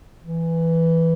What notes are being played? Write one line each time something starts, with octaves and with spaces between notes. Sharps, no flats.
E3